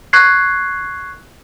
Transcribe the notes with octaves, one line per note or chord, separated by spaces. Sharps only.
C#6 F#6 G#6 C7